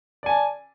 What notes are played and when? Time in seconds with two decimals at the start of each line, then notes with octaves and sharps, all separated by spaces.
0.23 D5
0.26 G#5
0.29 A5